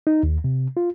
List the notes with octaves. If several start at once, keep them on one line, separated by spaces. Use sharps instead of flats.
D#4
D#2
C3
F4